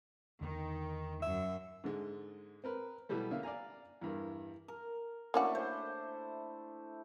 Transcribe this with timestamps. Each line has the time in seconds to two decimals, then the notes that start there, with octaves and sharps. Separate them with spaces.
0.41 E2 D3 D#3
1.22 F#2 E5
1.84 G#2 D3 G#3
2.64 C4 A#4 B4
3.09 B2 E3 F#3 G3 A3
3.31 D3 A#3 C#4 E5 F5
3.43 D5 F5 G#5 A#5
4.01 E2 G2 A#4
4.68 A#4
5.34 A3 A#3 C#4 D4 E4 F#4
5.55 C5